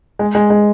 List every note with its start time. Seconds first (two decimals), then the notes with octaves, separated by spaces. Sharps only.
0.19 G#3
0.35 G#3
0.50 G#3